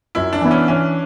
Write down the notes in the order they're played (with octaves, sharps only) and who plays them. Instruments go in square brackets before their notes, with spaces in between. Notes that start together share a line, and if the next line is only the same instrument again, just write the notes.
[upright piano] F#2 [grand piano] E4
[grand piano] D4
[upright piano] E3 B3 E4
[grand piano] C#4
[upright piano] E3 [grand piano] C#4